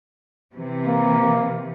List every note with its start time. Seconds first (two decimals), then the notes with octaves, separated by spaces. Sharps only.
0.53 C3 E3
0.87 A#3